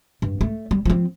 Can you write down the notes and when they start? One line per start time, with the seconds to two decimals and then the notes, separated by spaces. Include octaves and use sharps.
0.22 G2
0.41 A3
0.71 G3
0.85 F3 C4